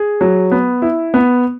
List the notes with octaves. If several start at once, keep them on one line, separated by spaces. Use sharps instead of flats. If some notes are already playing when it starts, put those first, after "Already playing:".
Already playing: G#4
F#3
B3
E4
B3